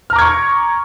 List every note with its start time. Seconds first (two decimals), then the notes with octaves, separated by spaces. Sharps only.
0.10 F6
0.13 A#5
0.16 D6
0.19 G#6
0.21 C#6